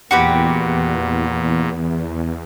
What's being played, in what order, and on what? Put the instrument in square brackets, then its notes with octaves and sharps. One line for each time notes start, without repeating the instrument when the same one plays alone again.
[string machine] E2 [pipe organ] A#2 [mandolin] F#4 G4 B4